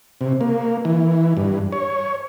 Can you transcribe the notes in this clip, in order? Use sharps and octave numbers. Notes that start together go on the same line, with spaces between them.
C3
A#3
E3
G2
C#5